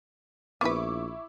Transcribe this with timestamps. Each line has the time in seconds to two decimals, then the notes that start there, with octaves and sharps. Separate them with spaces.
0.61 A#1 B3 E4 B4 C#6 D6